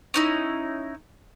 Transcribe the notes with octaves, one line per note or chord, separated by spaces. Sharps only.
C#4 D#4 E4